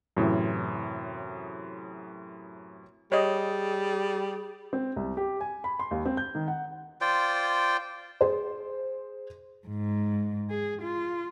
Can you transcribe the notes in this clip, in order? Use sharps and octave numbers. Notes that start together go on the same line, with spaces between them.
F#2 A2 C3 E3
G3 G#4 C#5 D#5
C4
C2
G4
G#5
B5
C6
D#2
C4
G6
D#3
F#5
F4 C5 D5 G5
G#4 C5
G#2
G#4
F4